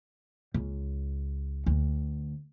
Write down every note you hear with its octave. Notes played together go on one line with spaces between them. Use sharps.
C#2
D2